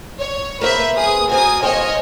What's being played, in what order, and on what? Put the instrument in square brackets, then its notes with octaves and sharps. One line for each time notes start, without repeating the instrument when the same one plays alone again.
[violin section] C#5
[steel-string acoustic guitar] A#3 B3 C5 [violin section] B4 E5
[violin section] G#4 D#6
[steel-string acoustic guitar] A#3 C4 F#4 [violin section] G#5 D#6
[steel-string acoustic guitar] E2 C5 F5 [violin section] C#5 D#5 G#5